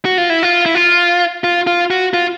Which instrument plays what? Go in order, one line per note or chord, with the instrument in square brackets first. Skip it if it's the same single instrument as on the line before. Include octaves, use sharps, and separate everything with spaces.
[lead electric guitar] F#4
F4
E4
F4
E4
F4
F4
F4
F#4
F4